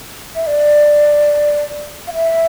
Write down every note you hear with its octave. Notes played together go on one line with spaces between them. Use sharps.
E5
D5
F5
E5